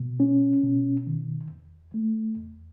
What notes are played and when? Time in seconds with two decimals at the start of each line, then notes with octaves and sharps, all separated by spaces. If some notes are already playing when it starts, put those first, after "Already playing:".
Already playing: B2
0.20 C#4
0.63 B2
1.07 D#3
1.50 E2
1.94 A3
2.37 E2